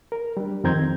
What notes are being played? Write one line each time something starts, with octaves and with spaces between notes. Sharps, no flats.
A#4
G3 D4
F2 D#3 C4 A#5 G6 G#6